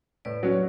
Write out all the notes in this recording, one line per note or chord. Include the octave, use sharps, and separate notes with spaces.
A2 B4 D5
F#3 C#4 F#4